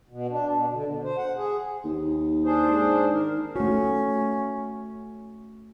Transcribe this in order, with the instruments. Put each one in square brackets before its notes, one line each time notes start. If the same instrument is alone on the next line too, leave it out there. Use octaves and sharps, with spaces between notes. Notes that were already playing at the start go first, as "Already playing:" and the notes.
[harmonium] B2
D4
B2
D3
B2
C5
F#5
G#4
[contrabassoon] D#2
[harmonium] D4 G#4 C5
[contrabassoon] G#2
[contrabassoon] D#3 [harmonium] A#4
[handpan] A3 F#4 [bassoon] C#4